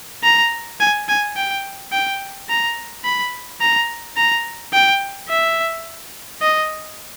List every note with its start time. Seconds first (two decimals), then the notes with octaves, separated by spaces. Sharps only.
0.24 A#5
0.80 G#5
1.09 G#5
1.36 G5
1.92 G5
2.49 A#5
3.05 B5
3.61 A#5
4.17 A#5
4.73 G5
5.29 E5
6.41 D#5